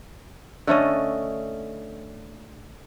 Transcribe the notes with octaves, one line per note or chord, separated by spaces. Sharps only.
D3 A3 C#4 D#5